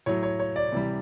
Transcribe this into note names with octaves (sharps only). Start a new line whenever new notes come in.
A2 F#3 C#5
C#5
C#5
D5
C3 E3 G3